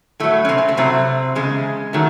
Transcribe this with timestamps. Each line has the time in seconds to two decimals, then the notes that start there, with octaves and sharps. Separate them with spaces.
0.20 A2 F#3 A3
0.45 C#4
0.49 C3 C4
0.58 G#3
0.68 A3
0.77 A2 C3 F#3 C4
1.35 E2 C#3 G#3
1.93 D#3 F#3 A3